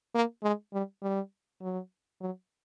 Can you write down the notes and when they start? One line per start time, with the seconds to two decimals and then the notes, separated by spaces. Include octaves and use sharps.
0.15 A#3
0.43 G#3
0.73 G3
1.02 G3
1.61 F#3
2.21 F#3